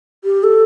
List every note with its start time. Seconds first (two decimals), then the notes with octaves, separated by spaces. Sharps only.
0.24 G4
0.44 A4